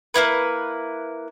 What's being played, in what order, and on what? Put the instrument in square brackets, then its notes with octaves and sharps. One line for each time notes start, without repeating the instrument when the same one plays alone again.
[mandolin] A#3 B3 E4 B4